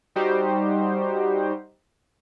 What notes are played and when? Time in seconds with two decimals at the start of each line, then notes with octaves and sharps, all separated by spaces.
0.16 G3 D#4 F#4 G4 C5